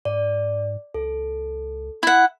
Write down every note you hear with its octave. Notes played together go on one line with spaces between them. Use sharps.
G#2 D5
C#2 A4
E4 F#5